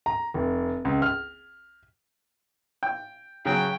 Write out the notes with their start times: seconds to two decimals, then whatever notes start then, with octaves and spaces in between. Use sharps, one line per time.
0.06 A#5
0.34 F1
0.85 C#2
1.02 F6
2.83 G5
3.46 C#3 F#3 G5